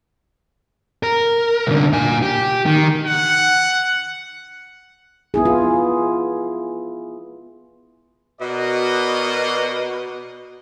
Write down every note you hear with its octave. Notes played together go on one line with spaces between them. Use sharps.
A#4
C2 D3
A#2 G#5
G4
D#3
F#5
B3 E4 G#4
F4
B2 A#4 D5 D#5